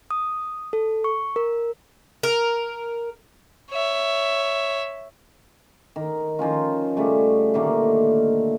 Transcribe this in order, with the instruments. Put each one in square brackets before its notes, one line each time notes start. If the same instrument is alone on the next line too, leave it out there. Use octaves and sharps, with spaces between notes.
[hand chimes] D#6
A4
C#6
A#4
[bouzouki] A#4
[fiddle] C#5 E5
[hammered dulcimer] D#3
D#3 F3 C#4 F4
C#3 G3 A3
A#2 D3 D#3 A3